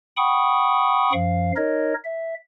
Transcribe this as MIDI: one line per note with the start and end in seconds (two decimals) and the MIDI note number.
0.17 1.12 78
0.17 1.12 79
0.17 1.12 83
0.17 1.12 85
0.17 1.12 87
1.13 1.52 42
1.13 1.52 53
1.13 1.52 77
1.57 1.94 63
1.57 1.94 70
1.57 1.94 73
1.57 1.94 75
2.04 2.34 76